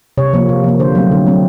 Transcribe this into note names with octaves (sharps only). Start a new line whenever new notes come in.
C3 C#5
F3 A#3
C3
F3 A#3
D3 C5
F#3 A3 C4
D3
F#3 A3 C4